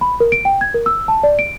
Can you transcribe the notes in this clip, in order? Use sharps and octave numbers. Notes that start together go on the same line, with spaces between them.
B5
A#4
D7
G5
G#6
A#4
E6
A5
D5
D7